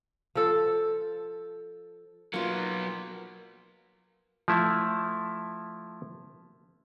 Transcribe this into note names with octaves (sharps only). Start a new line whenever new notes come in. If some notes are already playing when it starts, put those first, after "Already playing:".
F3 A4
F#3 A#3 B3 F4
F3 A3 E4